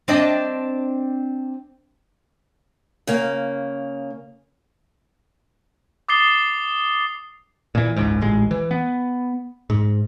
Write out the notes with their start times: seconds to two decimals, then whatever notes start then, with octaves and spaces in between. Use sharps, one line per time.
0.08 C4 D4 D#5
3.07 C#3 A#3
6.08 D6 D#6 A6 C7 G7
7.75 A#2 E3
7.96 F#1 C#2 G#2
8.21 D#1 A1 G#3
8.51 E3
8.71 B3
9.70 G#2